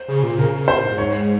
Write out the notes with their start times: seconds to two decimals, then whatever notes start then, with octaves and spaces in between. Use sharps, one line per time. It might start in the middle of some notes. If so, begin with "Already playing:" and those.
Already playing: C5
0.08 C#3
0.23 A#2
0.38 C#3 A#4
0.53 C#3
0.68 A#2 C5
0.83 G#2
0.98 C#5